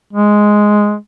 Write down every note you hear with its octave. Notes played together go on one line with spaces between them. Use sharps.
G#3